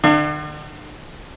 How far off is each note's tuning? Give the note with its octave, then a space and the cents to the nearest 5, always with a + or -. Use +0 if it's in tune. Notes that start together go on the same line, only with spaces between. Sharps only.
D3 +45 D4 +40 F5 -30